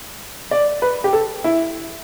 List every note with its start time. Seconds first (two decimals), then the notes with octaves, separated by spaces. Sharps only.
0.51 D5
0.82 B4
1.04 G4
1.13 A4
1.44 E4